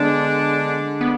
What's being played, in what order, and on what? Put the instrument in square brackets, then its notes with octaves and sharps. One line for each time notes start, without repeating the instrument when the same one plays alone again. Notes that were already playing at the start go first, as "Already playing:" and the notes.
Already playing: [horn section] D3 G#3 D4 [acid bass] B3
[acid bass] B3